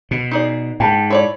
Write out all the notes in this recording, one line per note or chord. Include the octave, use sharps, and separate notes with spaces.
B2
D#4 G#4 D5
G#2 G5 A5
E4 C#5 D5